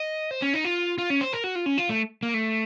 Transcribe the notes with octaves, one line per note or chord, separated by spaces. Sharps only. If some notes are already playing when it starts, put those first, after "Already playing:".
Already playing: D#5
C5
C#4
D#4
F4
F4
C#4
C5
A#4
F#4
F4
C#4
F4
A3
A#3
A3